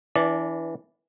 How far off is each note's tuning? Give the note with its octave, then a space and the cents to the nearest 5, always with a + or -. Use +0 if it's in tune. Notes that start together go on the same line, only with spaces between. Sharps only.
E3 -5 D4 -35 D5 -5